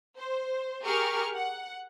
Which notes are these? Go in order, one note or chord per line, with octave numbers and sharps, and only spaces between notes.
C5
G4 G#4 A#4 C#6 F6
F#5